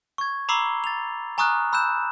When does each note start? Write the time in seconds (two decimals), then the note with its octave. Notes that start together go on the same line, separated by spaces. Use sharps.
0.18 C#6 G#6
0.49 A#5 B5 D6 E6 C7 G7
0.84 A6 F7
1.38 G#5 A#5 C#6 D#6 F6 F#6
1.73 B5 E6 F#6 G6 E7